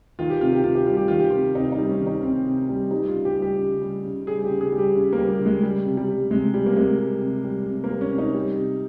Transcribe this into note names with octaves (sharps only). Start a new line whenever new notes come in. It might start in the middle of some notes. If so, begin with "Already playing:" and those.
D#3 F4
G4
C3 F4
G4
C3 F4
G4
G3 F4
G4
D#3 F4
G4
C3 F4
C3 D#4
D#4
G3
C#4
D#3
D#4
C3 C4
C3
G3
G3 D#4
F4
C#3
G4
G3
G4
C#3
G3
C#3
G3 G#4
G4
C#3
G#4
G3
G4
C#3
A#3
G3
G3
C#3
G#3
G3
C3
G3
G3
C3 G#3
G3
A#3
C3 G#3
G3
C3
G3
C3
A#3
G3
C#4
C3
D#4
G3
C3